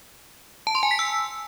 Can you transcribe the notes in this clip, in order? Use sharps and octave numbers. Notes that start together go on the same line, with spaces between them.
A5
C6
G#5
B6
E6